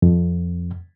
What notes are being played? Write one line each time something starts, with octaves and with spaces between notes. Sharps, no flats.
F2